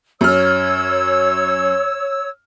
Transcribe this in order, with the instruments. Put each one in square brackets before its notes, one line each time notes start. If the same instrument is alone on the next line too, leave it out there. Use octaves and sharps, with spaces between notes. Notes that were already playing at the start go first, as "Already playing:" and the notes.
[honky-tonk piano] F#2 F6 [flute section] C#5 E6